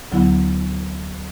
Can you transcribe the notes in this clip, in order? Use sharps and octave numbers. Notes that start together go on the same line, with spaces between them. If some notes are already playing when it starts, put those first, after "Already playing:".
D2 D3 F#3 B3 E4